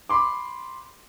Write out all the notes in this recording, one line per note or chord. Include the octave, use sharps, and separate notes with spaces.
B5 C6 D6